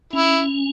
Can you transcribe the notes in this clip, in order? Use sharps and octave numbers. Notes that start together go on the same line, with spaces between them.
C#4 E4